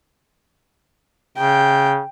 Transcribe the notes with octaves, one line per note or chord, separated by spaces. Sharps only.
C#3 G5